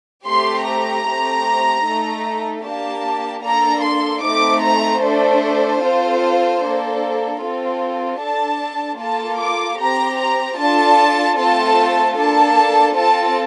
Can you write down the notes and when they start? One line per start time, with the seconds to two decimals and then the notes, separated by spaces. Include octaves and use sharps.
0.25 A3 C4 G4 C6
0.65 A#5
1.05 A3 C4 G4
1.84 A3 D#4 A4
2.63 A#3 D4 G4 A5
3.42 A#3 D4 A4 A#5
3.83 C6
4.22 A3 C4 D#4 D6
4.62 A#5
5.02 A3 D4 A4 C5
5.81 C4 F4 A4
6.61 A#3 D4 A4
7.40 C4 F4 A4
8.19 D4 A4 A5
8.99 A#3 F4 A4 A5
9.38 D6
9.79 C4 G4 A#5
10.18 A#5
10.58 D4 F4 A4 A5
11.37 A3 C4 F4 A4 A5
12.16 A#3 D4 A4 A5
12.96 C4 F4 A4 A5